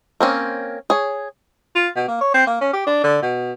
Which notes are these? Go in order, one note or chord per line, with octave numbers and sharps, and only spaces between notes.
A#3 C4 C#4
G#4 C#5
F4
B2
A#3
C#5
C4
A#3
C#4
G4
D4
D3
B2